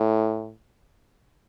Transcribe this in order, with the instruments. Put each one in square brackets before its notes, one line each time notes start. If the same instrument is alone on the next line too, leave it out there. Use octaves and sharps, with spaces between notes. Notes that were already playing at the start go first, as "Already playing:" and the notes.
Already playing: [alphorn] A2